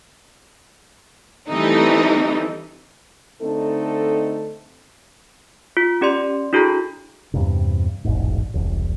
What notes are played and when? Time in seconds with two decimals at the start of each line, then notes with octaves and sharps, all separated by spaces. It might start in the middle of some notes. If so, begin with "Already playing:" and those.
1.49 E3 G3 A3 C4 D#4
3.42 D3 A3 C4 D#4 A4
5.77 F4
6.01 C#4 G4 D5 C6
6.53 D4 E4 F#4 G#4 A4 A#5
7.34 E2 G2 C3
8.05 E1 A1 G#2
8.54 E1 C2